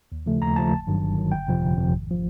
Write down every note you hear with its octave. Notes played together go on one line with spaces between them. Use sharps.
D#2
C#3 F3 A3
D#2 A#5
C#3 F3 A3 A5
G1
G2 D#3 F#3
G1
G2 D#3 F#3
G1 G5
F2 C3 F3
G1
F2 C3 F3
G#1
F3